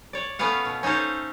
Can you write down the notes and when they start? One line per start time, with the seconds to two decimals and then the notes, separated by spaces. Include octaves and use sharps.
0.13 C#5 D5
0.39 A3 B3 C#4 B4 F5 F#5
0.65 B2
0.83 C#4 D#4 A4 C5 C#5